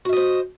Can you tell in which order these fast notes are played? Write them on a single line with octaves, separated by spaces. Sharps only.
F#4 E5 D#5 C5